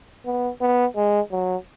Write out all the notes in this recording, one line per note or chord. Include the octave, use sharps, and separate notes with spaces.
B3
B3
G#3
F#3